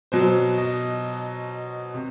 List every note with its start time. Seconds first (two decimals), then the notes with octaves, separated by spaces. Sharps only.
0.12 B2 F#3 C5
0.58 D#5
1.94 C3